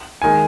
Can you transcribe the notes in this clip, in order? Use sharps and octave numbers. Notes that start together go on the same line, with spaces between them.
D#3 G#3 G#5